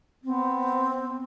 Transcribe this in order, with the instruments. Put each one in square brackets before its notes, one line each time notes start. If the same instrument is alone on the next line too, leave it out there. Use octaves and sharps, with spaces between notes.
[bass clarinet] B3 [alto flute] C4